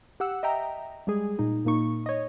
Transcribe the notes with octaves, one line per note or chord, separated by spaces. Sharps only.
G4 F#5 E6
D#5 E5 G5 A#5
G3 G#3 G#4
A#2 D#4
A#2 A#3 D#4 C#6
C#5 D#5